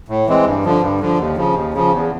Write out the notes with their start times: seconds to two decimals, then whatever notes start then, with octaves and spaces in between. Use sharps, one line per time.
0.08 A2
0.27 E3 G#3 C4
0.46 G2
0.64 D3 F3
0.82 G2
1.00 D3 F3
1.18 D#2
1.37 C#3 F3
1.55 D#2
1.74 C#3 F3
1.92 E2